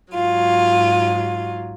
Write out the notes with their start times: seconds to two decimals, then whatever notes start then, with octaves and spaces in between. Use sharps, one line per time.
0.12 G#2 F#3 F4